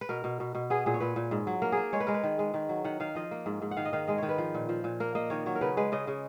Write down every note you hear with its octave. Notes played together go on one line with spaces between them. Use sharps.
B4
B2 A#4
B2
B2
B2
B3 G#4
A#2 G#4
C#5
A#2 B4
A#2
G#2
F#3
A#3 A#4
A#3 G#4
G#3 C#5
B4
G#3 A#4
B4
D#3
G#3
D#3
F#3
D#3 F#5
D#3 F5
F3 D#5
A#3
G#2
G#2
F#5
D#3 F5
D#5
D#3 F5
G#3 D#5
D#3 C#5
B4
F3
A#2
F3
A#2
A#3 A#4
A#3 D#5
D#3 C#5
F#3 C#5
A#4
C#3 B4
G#3 B4
C#3 D#5
C#3